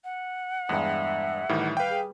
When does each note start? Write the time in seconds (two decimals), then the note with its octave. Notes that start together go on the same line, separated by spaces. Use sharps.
0.04 F#5
0.69 E2 G2 G#3 E5
1.49 A2 D#3 E3 G3
1.77 B4 F5 G5
1.89 G#4